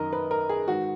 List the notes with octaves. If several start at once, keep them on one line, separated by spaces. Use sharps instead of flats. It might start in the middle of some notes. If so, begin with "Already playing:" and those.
Already playing: F#2 D#3 A#4 D#5
B4
A#4
G#4
G#2 D#3 F#4